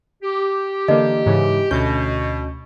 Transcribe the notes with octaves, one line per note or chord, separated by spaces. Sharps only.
G4
D3 E3 A#3 D#5
G#2 C#3 E3
D2 B2 C#4 G6